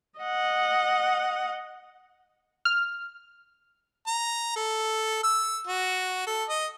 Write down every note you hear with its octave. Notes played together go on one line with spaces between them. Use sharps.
D#5 F#5
F6
A#5
A4
E6
F#4
A4
D#5